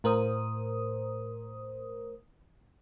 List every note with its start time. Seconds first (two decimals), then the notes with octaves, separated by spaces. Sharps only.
0.04 A2 A#4 C5 D#6